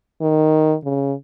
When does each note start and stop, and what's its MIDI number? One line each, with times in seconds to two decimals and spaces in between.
0.21 0.75 51
0.84 1.13 49